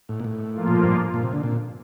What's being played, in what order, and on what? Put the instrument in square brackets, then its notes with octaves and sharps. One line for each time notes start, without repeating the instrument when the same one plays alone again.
[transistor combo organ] A2
A#2
A2
[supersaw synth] F3 A#3 F4
[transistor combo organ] A#2
A2
G2
A#2
C3
D3
A#2